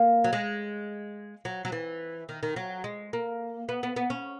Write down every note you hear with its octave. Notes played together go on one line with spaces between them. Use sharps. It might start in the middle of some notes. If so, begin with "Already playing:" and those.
Already playing: A#3
F#3
G#3
F#3
F#3
E3
D#3
D#3
F#3
G#3
A#3
B3
B3
B3
C#4